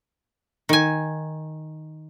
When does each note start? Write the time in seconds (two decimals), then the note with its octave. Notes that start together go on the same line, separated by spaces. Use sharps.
0.69 D#3 G#5